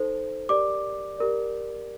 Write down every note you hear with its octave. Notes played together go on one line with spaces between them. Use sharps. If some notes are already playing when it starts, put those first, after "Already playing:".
Already playing: D#4 A4 C5
G4 A#4 D5 D6
G4 A#4 D5